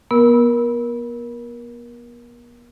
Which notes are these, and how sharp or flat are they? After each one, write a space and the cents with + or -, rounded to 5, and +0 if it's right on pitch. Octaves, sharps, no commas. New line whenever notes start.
B3 -35 A#4 +25 E6 -15